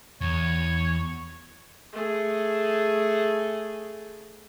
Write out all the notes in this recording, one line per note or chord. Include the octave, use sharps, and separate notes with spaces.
E2 C#5
A3 G#4